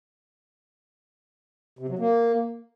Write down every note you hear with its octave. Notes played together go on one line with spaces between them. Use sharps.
C3
F#3
A#3